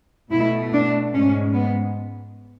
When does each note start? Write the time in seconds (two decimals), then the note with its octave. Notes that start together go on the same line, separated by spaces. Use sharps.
0.31 B2 A3 E4
0.73 D4
1.13 G#2 G#3 C#4
1.53 B3